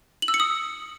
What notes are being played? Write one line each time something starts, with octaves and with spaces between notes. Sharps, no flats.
F#7
E6
C#7
D#6